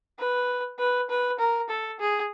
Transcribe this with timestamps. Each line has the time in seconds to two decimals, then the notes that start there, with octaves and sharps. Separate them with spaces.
0.19 B4
0.79 B4
1.10 B4
1.39 A#4
1.70 A4
2.00 G#4